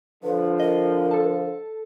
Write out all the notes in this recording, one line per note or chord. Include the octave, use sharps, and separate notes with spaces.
D3 F3 B4
A#4 D#5
A4 A5